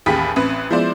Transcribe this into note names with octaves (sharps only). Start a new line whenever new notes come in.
A1 D#2 G4 G#4 B5 B6
A1 C4 B4
F3 G#3 B3 E4 C5 D5